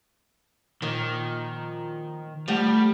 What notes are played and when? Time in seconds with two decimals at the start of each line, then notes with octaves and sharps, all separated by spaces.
0.82 A#2 D#3 F3
2.48 F3 G3 A3 F#4